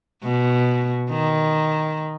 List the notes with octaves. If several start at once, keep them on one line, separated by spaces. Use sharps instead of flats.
B2
D#3